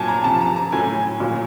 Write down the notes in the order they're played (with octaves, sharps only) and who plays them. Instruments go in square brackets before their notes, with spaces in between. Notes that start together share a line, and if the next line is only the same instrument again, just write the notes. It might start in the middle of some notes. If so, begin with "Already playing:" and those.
Already playing: [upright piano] A#2 F#3 G#5 A5
A#5
C3 F3 A5
A#5
A#5
A2 F#3 G#5
A#2 F#3